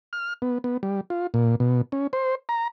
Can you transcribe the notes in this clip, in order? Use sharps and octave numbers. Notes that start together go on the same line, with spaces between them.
F6
B3
B3
G3
F4
A#2
B2
C#4
C5
A#5